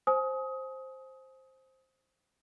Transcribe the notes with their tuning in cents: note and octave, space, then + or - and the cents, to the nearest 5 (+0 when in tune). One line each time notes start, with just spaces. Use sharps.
C5 +5 G#5 +30 D#6 +25